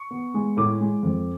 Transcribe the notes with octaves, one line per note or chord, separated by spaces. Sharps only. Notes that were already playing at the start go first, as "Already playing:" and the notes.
Already playing: C#6
B3
G#3
A2 D6
G#3
F2